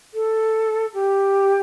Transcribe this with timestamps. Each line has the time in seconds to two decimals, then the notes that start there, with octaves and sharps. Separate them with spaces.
0.14 A4
0.94 G4